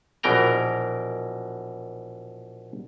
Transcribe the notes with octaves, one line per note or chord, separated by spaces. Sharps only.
A#1 B2 E3 A#4 G5 A#5